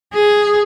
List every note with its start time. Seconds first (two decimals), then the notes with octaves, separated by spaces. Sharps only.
0.13 G#4